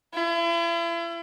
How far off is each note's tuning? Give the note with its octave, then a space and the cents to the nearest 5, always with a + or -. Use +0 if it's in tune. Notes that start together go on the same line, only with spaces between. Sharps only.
E4 +40